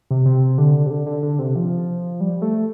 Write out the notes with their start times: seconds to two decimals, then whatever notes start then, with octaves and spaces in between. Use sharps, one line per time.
0.11 C3
0.26 C3
0.58 D3
0.87 C3
0.91 D3
1.07 D3
1.23 D3
1.39 C3
1.56 F3
2.21 G3
2.42 A3